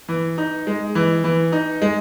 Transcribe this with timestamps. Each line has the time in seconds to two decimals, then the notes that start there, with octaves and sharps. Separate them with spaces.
0.09 E3
0.38 D#4
0.67 G#3
0.95 E3
1.24 E3
1.52 D#4
1.82 G#3